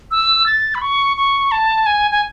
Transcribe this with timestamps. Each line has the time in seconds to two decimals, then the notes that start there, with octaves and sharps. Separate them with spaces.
0.11 E6
0.46 A6
0.75 B5
0.81 C#6
1.17 C#6
1.51 A5
1.86 G#5
2.11 G#5